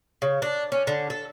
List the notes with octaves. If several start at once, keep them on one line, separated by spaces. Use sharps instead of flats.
C#3
D4
C#4
D3
A4